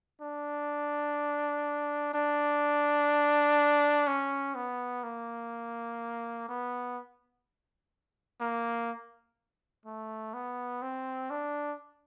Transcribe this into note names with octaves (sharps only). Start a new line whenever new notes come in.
D4
D4
C#4
B3
A#3
B3
A#3
A3
B3
C4
D4